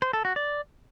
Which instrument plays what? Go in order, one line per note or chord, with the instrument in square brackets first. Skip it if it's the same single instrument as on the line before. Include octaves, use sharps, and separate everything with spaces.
[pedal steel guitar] C5
A4
F#4
D5